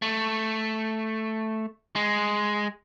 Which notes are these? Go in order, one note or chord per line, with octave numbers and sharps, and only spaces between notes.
A3
G#3